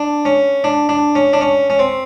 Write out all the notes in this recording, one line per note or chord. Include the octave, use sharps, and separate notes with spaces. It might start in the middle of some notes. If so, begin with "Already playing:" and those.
Already playing: D4
C#4
D4
D4
C#4
D4
C#4
C#4
C4